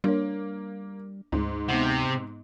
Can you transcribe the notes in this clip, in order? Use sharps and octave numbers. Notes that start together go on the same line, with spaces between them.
G3 A#3 D4 C#5
D2 G#2
C3 B3 D#4 F#5